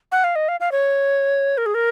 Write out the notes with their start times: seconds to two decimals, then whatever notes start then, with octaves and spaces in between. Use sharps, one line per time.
0.12 F#5
0.24 F5
0.35 D#5
0.48 F5
0.60 F5
0.72 C#5
1.58 A#4
1.66 G#4
1.74 A#4